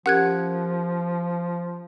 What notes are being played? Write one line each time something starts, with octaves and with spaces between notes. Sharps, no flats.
F3 C#4 G4 A#4 F#5 F#6 G#6